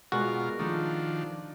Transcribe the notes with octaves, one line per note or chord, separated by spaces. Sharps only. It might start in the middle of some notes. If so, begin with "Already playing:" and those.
B2 G#3 F4 F#4 A#4 D5
D#3 F3 D4 D#4 F4 A4